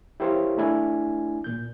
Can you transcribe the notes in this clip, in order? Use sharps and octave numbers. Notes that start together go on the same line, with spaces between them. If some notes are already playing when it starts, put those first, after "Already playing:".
E4 G4 A#4 C5 C#5 F5
A3 D4 E4 G#5
A#2 G6